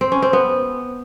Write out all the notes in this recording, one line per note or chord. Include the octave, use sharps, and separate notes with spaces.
C4
C#4
C4
B3